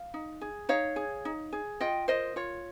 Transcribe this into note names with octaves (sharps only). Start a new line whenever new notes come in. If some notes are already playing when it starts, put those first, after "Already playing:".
Already playing: F5
D#4
G#4
D#4 C#5 F5
G#4
D#4
G#4
F4 D#5 G5
A#4 C5 D#5
F4 C#5